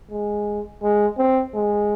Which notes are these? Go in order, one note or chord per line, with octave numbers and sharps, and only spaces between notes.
G#3
G#3
C4
G#3